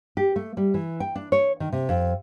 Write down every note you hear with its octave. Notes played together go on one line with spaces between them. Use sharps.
G4
A3
G3
E3
G5
D4
C#5
D#3
C3
F2